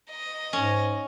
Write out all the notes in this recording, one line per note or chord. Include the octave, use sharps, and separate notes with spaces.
D#5
G#2 C#4